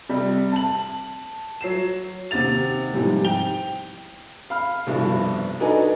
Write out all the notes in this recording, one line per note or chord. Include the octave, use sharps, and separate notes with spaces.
C3 G3
A5 F#7
F#3 C7 E7
D#2 C3 F#5 A6 F7
G#2 C3 E3 F3 G3
G5 F7 G7
F5 B5 F6
F1 C2 G2 B2 F3
D4 D#4 F#4 A4 B4 G#5